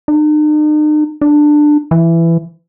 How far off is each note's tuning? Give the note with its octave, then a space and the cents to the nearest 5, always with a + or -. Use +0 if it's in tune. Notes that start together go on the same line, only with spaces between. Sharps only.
D#4 -45
D4 +15
E3 +15